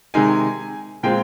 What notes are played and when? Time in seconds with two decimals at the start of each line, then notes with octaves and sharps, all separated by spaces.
0.14 C3 D#3 G#3 D#4 G#5
1.03 A#2 G#3 C4 F4 G5